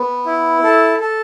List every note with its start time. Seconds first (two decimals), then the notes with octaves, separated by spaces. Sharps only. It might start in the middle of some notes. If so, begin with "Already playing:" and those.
Already playing: B3
0.26 E4
0.64 A4
1.00 A4